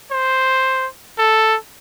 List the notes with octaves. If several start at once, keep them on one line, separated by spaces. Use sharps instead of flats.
C5
A4